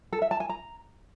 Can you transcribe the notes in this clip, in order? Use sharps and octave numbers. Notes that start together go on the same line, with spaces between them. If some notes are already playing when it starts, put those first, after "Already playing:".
A4
E5
A5
G#5
A#5